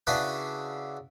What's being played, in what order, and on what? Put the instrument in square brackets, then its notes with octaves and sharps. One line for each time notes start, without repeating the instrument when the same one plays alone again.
[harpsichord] C#3 D4 E4 F#4 B4